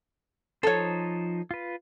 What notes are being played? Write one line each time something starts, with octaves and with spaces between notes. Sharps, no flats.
F3 D#4 A4 C5 C#5
F4 B4